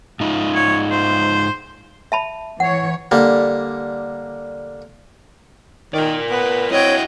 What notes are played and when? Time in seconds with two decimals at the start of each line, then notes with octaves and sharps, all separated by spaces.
0.20 G#2 D#4 F4
0.55 C#5
0.91 C5
2.12 E5 A5 B5
2.60 E3 C#5 F#5
3.11 D3 G3 A#3
5.94 D#3 A#4 D5
6.30 B3 B4
6.71 C4 E4 F#4 C#5 D#5 G5